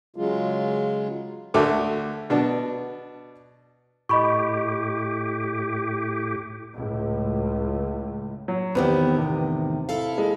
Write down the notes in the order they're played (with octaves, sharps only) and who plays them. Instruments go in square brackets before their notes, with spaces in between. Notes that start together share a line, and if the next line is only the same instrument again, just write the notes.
[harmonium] C#3 F#3 G#3 F4
[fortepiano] D2 A3 D6
B2 D4
[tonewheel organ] A2 G4 [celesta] D#5 B5 C#6
[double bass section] C#2 A2
[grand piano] F#3
[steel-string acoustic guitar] E2 A2 D#3 [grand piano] B3 C4 G4
[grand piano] C3
[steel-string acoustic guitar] E4 A4 F5
[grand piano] G#3